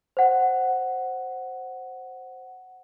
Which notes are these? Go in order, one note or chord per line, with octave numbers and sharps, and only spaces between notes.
C5 F#5